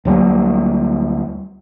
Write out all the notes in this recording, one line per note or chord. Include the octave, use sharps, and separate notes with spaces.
D2 F#3 G3 A#3